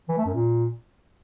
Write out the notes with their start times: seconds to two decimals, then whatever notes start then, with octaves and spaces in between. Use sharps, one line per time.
0.09 E3
0.17 A3
0.26 F#2
0.34 A#2